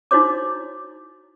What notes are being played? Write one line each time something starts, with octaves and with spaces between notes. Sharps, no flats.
D#4 E4 F#4 C5 C#5 D6